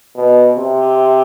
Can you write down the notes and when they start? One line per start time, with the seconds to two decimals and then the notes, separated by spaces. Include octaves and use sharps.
0.15 B2
0.56 C3